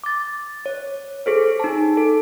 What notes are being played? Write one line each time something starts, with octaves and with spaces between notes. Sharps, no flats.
D6 A6
C#5
G#4 A4 C5
D#4 A5
A4